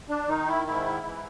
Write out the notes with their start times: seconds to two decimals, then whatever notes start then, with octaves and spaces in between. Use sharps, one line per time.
0.09 D4
0.28 D#3 D#4
0.48 E4
0.67 G#2 E4
1.06 E3